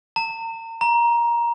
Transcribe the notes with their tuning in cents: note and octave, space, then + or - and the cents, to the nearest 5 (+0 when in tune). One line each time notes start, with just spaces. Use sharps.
A#5 -40
A#5 +15